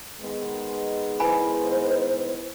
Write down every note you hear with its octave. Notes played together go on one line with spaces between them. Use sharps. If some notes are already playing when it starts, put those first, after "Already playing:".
D#3 G#3 B3
E4 B4 C5 G#5 B5